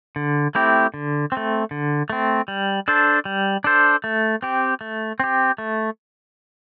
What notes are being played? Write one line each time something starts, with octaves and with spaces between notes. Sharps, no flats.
D3
A3 C4 E4 G4
D3
A3 C4
D3
A3 C4
G3
D4 A4 C5
G3
D4 A4 C5
A3
C4 G4
A3
C4 G4
A3